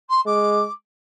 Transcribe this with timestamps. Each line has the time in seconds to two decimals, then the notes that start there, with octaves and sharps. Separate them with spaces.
0.09 C6
0.26 G#3 D6